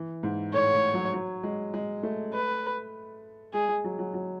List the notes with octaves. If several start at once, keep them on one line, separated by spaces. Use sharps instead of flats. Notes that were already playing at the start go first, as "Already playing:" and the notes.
Already playing: E3
G#2
A2 C#5
A2
F#3
F#3
G#3
G#3
A3
B4
G#3 G#4
G#3
F#3
F#3
F#3